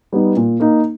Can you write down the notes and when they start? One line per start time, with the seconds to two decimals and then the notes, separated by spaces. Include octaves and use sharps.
0.12 G3 B3 D#4
0.37 A#2
0.60 A#3 D#4